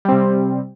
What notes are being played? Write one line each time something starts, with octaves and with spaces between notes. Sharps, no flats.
C3 G3 C4